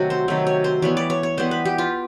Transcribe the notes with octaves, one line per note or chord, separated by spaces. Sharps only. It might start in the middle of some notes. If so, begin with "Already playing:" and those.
Already playing: C3 D#3 F#3 A3 F#4
C5
C3 D#3 F#3 A3 C#5
C#5
C5
E3 G3 B3 C#5
D5
C#5
C#5
E3 G3 B3 C5
B4
G4
F4